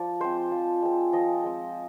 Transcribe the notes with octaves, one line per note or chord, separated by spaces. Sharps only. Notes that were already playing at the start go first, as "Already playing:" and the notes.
Already playing: F3 D5
G#3 C4 C5
F3
G#3 C4
F3 D#5
G#3 C4